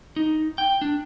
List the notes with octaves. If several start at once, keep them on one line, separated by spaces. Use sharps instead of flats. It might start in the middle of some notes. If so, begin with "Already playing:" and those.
D#4
G5
D4